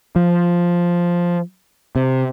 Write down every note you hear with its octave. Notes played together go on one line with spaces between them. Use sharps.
F3
C3